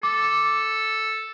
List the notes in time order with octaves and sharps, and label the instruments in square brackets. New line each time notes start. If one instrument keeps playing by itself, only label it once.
[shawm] A4 [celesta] D6